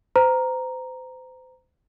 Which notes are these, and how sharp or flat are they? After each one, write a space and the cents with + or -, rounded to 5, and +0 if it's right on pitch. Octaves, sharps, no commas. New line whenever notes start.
C5 -35 A#5 +0